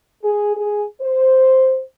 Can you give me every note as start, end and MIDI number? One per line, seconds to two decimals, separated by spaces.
0.22 0.55 68
0.55 0.83 68
1.01 1.81 72